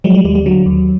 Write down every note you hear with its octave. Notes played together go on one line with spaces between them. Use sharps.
F3 F#3 G#3
G3
D#2 G3
G3
D3 F#3
D#2